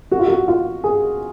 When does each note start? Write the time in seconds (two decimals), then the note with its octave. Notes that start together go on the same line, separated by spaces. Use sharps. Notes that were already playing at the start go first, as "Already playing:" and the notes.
0.11 F#4
0.19 F4
0.28 F#4
0.48 F4
0.84 G#4